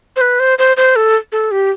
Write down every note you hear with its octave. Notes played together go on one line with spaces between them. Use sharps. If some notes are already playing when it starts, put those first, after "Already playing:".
C5
B4
C5
C5
C5
A4
A4
G4